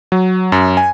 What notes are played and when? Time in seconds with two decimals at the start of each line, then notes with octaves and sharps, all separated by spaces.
0.12 F#3
0.52 F#2
0.77 G#5